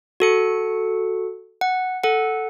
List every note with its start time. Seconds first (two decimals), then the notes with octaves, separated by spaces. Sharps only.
0.20 F#4 A4 C#7
1.61 F#5
2.04 A4 F#5